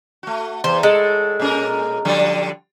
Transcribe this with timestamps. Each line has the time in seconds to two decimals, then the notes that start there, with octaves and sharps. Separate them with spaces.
0.23 A3 F#4
0.64 E2 C5
0.83 A2 G#3 A4
1.40 A#2 C#4 A#4
2.05 D3 F3 G3